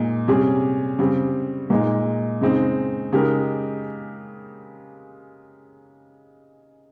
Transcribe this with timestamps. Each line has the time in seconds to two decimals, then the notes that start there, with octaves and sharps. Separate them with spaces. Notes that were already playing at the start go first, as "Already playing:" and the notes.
Already playing: A#2 G#3 D#4
0.28 C3 G3 C#4 G#4
0.99 C#3 G3 C4
1.70 A#2 G#3 D#4
2.41 C#3 G#3 C4 D#4
3.13 C#3 G#3 D#4 G4 A#4